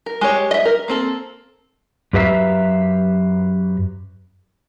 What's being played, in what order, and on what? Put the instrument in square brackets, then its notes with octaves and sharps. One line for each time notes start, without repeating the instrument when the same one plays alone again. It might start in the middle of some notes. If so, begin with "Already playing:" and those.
[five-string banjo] A#4
G#3 G4 C#5
D#5 E5
A#4
A#3 C4 A4
[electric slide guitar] F#2 G4 B4 E5 F5 A#5